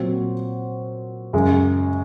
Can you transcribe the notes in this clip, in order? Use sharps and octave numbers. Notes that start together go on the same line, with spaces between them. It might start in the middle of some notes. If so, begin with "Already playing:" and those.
Already playing: A#2 F#3 C4 F#4 C5
F#2 C#3 G#3